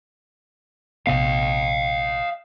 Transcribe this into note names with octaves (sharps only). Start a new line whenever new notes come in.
A#1 C3 B3 D#5 F5